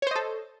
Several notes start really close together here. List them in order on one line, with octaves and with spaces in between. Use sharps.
C#5 C5 D#5 A4